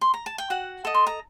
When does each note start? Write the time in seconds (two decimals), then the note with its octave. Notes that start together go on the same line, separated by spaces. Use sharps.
0.01 C6
0.14 A#5
0.26 A5
0.38 G5
0.50 F#4 F#5
0.85 A4 D#5
0.94 C6
1.07 A#5